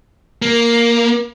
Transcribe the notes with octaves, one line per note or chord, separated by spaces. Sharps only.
A#3